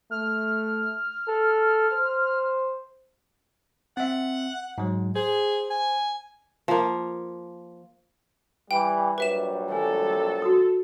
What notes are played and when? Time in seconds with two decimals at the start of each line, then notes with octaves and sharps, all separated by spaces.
0.11 A3 F6
1.28 A4
1.93 C5
3.97 C4 E5 F#5
4.78 G#2 F#3
5.16 G#4 C5
5.70 G#5
6.68 F3 A#3
8.71 E3 G3 G5
9.18 A#1 F#3 G3 B4 E5 E7
9.72 A4 G#5
10.42 F#4 D#6